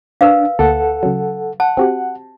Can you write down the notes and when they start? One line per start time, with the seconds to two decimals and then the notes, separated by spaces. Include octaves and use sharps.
0.21 D4 A#4 B4 F5
0.59 D2 A#3 A4 F#5 D6
1.03 C#3 F#3
1.60 F#5 A5
1.77 C4 F#4 G4